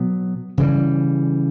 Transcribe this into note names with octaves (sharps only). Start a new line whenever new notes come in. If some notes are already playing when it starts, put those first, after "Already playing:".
Already playing: B2 F#3 B3
C#3 E3 G3